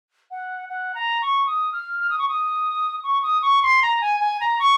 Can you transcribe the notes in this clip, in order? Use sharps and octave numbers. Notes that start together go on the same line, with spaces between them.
F#5
F#5
A#5
C#6
D#6
F6
F6
D#6
C#6
D#6
C#6
D#6
C#6
C6
A#5
G#5
G#5
A#5
C#6